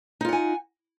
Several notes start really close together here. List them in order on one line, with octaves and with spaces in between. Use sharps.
D#4 F4 F#5 G#5